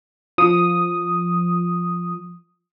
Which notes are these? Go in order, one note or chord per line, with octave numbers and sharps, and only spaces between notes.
F3 D#6